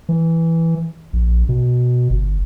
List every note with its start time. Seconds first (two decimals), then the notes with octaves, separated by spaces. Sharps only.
0.09 E3
1.13 A#1
1.49 B2
2.10 G1